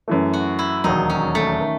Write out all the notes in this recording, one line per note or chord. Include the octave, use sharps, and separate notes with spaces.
F#2 E3 A3
F#4
E4
E1 D#2 D#3 F#3 D#4
C#4
A3
D#3